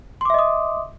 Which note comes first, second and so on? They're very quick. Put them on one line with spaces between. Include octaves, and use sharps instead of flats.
C6 D6 E5 D#5 D#6